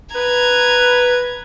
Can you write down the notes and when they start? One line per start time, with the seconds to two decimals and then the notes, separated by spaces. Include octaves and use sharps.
0.15 B4 A#5 G#6